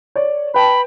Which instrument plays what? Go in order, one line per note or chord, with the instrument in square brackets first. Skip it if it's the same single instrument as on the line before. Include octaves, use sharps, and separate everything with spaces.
[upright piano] C#5 D5
[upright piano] B4 G5 A5 [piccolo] B5